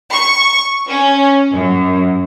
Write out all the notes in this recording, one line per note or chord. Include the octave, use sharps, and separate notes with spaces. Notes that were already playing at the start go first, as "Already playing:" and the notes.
C#6
C#4
F#2